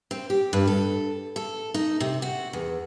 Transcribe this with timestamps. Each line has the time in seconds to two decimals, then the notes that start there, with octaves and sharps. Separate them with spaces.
0.11 C4
0.30 G4
0.53 G2
0.67 A4
1.36 A4
1.74 D#4
2.00 C3
2.22 F#4
2.53 E2